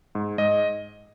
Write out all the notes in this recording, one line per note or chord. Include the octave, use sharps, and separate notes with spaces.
G#2
G#2 D#5